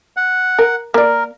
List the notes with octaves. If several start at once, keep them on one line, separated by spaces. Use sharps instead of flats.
F#5
A#4
A#3 A#4 D5